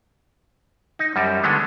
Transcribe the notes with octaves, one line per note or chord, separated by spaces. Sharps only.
D#4
F#2 G3
D3 G#3 A3 B3